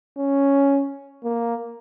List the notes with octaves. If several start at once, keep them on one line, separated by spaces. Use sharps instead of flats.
C#4
A#3